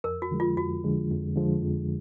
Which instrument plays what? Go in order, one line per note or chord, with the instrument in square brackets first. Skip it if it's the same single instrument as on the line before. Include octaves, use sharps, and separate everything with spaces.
[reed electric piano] F2 [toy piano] A#4
[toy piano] F#4
[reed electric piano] D3 F3 G#3
[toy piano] F4
[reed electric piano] F2 [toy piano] F#4
[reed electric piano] D3 F3 G#3
F2
D3 F3 G#3
F2